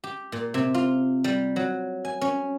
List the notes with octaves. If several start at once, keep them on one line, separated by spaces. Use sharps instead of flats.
G4
A#2
C3
F4
G3
F#3
G#5
C#4